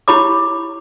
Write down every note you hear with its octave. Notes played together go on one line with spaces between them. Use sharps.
E4 G4 C#5 B5 D6